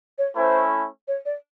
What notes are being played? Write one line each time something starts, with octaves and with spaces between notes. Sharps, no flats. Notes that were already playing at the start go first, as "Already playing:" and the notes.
C#5
A3 C#4 E4 C5
C#5
D5